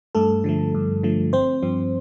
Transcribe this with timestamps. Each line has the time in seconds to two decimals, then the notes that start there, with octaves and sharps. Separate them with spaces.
0.15 G2 A3 A4
0.44 D3 F3 A3
0.74 G2
1.03 D3 F3 A3
1.32 G1 C4 C5
1.62 G2 F3 C4